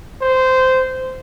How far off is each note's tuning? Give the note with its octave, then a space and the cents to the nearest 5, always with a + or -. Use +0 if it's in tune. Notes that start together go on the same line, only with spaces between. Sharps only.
C5 -15